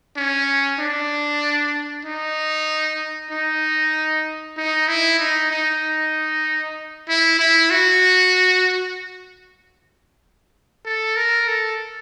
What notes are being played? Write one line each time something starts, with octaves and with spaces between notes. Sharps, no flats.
C#4
D4
D#4
D#4
D#4
E4
D#4
D#4
E4
E4
F#4
A4
A#4
A4